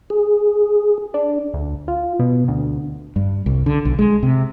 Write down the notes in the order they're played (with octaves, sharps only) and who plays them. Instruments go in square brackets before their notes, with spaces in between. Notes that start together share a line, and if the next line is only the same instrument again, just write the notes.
[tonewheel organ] G#4
[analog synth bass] D4
D2
F4
B2
D2
[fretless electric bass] G2
C2
D3
B1
G#3
C3